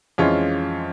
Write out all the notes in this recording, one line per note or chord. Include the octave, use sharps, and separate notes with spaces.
F2 E3 G#3 C#4 F4